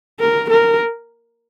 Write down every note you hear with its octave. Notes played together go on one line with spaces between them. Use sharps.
A#4
A#4